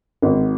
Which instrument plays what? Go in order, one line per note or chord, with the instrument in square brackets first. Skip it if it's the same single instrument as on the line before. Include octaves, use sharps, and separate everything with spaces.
[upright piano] G#1